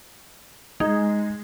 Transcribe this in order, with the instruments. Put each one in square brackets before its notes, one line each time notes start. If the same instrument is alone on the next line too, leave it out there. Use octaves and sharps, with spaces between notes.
[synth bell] G#3 [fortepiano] D#4